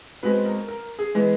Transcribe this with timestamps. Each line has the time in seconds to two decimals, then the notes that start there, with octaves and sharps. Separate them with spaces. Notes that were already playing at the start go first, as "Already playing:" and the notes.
0.23 B2 G#3 C4 B4
0.46 A#4
0.68 A#4
0.99 G#4
1.15 E3 G#3 B3